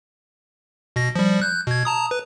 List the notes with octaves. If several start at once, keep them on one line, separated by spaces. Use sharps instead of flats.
B2 A#6
F3 G3
F#6 G6
B2 G#6
A5 A#5 D#6
B4